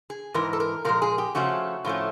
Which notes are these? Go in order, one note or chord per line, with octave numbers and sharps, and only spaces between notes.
G#4
G#2 E3 A#4
A4
A#4
A#2 F3 G#3 A#4
G#4
G4
C#3 F3 A3 C#4 F#4
A2 F3 A3 C#4